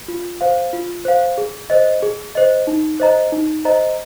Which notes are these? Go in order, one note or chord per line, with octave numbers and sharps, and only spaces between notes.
F4
C5 F5
F4
C5 F5
G#4
C5 D#5
G#4
C5 D#5
D#4
C5 D#5 A#5
D#4
C5 D#5 A#5